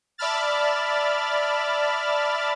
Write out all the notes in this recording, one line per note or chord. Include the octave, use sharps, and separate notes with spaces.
D5 E5 A5 B5 F6 A6